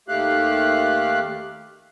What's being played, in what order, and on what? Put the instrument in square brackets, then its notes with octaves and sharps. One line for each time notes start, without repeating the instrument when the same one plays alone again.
[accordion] D#2 A3 G4 F5 F#6